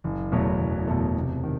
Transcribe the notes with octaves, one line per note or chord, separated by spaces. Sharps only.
F#1
E2 B2 F#3 A3
F#1
E2 B2 F#3 A3
C3
D#3